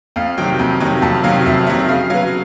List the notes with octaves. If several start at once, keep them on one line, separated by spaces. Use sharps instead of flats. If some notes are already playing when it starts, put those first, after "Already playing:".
F2 F5
C3 D#3 F#3 G5
F2
C3 D#3 F#3
F2 A5
C3 D#3 F#3 F5
F2 E5
C3 D#3 F#3 E5
C#3 F5
F#3 B3 F5